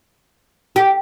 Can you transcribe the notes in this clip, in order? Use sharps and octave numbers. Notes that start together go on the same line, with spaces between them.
G4